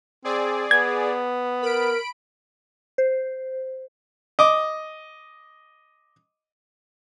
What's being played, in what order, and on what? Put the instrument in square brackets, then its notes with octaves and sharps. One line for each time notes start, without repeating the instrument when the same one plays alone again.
[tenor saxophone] C4 [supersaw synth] G#4 D5
[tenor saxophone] B3 [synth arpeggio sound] G#6
[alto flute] A#4 [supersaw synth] B5 D7
[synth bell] C5
[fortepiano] D#5 D6